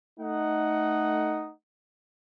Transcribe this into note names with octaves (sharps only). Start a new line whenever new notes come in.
A3 D#4 F#5